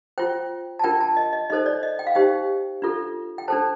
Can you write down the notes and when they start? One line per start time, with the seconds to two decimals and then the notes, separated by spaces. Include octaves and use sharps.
0.18 F4 C5 G5
0.79 A5
0.84 D4 F4 A#4 G5
1.01 A5
1.17 D#5
1.33 D#5
1.50 D#4 A4 C5 D#5
1.66 D5
1.83 D#5
1.99 G5
2.07 F5
2.15 D#4 G4 C5 G5
2.82 D4 F4 A4
3.38 G5
3.48 D4 A4 C5 A5